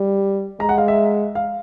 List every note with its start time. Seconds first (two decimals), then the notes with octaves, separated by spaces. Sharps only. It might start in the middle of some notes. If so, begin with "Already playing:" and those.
Already playing: G3
0.60 G#3 A#5
0.69 F#5
0.78 F5
0.88 E5
1.35 F5